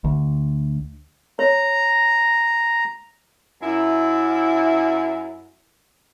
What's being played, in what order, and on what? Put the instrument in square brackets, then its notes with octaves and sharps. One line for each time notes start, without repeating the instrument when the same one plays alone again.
[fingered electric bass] D2
[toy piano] C#5 [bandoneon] A#5
[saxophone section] F#2 E4